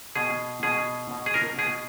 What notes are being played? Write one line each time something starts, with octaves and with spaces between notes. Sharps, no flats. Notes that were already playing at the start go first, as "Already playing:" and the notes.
B2 G#4
B2 G#4
B2
G#4
A#4
B2 G#4